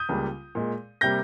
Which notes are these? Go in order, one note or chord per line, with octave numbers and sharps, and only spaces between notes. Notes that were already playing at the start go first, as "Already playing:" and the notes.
Already playing: D#6 G6
C#2 C#3 G3 A#3
A#2 G#3
C3 G3 A#3 G6 A#6